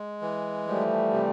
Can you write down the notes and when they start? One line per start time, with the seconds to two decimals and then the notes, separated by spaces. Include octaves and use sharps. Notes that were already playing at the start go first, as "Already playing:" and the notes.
Already playing: G#3
0.22 E3
0.67 F3 G3 A3
1.13 C3